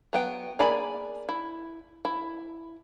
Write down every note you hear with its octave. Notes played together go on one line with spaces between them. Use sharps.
F#3 B3 G5
A#3 G#4 D5 G#5 B5
E4
E4